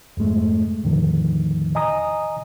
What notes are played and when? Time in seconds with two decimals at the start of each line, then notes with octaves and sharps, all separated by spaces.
0.17 F2 G#2 G#3 A3
0.83 E2 A2 D3 D#3 F3
1.75 D#5 G#5 A#5 D#6